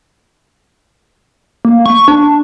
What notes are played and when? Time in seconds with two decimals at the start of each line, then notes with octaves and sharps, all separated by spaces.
1.65 A#3
1.86 C#6
2.08 D4